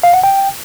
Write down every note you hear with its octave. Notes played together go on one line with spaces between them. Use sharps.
F5
F#5
G5